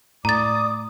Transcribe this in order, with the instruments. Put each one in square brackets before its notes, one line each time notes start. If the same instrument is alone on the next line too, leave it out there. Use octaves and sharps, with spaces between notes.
[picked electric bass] A2 [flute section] D5 D6 D#6 [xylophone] A#5 A6